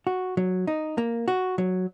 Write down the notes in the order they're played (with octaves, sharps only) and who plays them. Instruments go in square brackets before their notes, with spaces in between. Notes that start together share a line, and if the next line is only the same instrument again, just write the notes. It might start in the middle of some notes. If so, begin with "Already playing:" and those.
[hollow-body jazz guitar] F#4
F#3
D#4
A#3
F#4
F#3